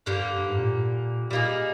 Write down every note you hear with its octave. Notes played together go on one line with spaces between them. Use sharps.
G2 D3 G3 A#3
G2
G#2
A#2
A#2 G3 A#3 D#4 G#4